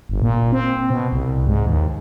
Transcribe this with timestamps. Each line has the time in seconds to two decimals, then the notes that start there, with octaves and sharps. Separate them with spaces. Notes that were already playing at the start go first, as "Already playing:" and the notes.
0.09 G1
0.22 A#2
0.52 C4
0.90 B2
1.12 C2
1.47 G#2
1.67 D#2